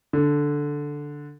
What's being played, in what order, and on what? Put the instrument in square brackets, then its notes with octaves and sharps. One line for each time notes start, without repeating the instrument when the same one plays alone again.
[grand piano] D3